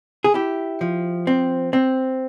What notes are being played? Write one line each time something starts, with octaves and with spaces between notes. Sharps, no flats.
G#4
E4 G4
F3
C4
C4